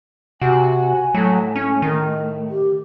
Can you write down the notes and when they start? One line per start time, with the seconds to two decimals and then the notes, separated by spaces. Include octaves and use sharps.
0.41 C3 F#4 G#5
1.14 A2 F#3 A3
1.56 C#4
1.82 D#3 A#4
2.50 G4